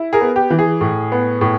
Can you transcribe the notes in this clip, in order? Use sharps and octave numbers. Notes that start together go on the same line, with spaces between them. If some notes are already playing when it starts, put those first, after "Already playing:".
Already playing: E4
G#4 A#4
B3
G4
E3
G#4
A2
B3
A2